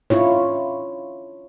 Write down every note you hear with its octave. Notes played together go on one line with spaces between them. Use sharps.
D4 E4 F4 C#5